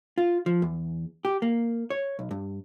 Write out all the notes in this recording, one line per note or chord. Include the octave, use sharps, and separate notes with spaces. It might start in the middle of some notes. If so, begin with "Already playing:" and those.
F4
F3
E2
G4
A#3
C#5
B1
G2